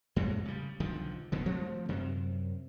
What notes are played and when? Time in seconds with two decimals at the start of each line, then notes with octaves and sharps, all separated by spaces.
0.16 F2 A2 G#3
0.45 C#3 G3
0.80 B1 D3 D#3 F3
1.32 F1 B2 D#3
1.46 F3 G3 A3 C4
1.89 F#2 C3